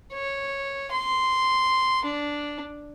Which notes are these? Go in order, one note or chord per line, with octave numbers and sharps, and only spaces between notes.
C#5
C6
D4